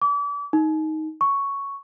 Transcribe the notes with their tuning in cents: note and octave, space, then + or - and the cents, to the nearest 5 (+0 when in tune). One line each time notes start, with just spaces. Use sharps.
D6 -35
D#4 +10
C#6 +5